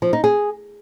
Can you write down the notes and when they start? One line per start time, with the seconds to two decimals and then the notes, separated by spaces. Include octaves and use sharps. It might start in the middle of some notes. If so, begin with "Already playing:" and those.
0.02 F3
0.13 D#4
0.24 G#4